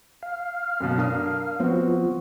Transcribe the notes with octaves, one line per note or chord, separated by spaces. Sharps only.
F5
F#2 B2
D4 A#4 D#6
F3 B3 C4 F#4